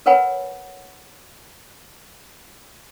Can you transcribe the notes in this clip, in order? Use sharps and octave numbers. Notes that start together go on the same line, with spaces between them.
A#4 B4 C#5 F#5 G#5 B5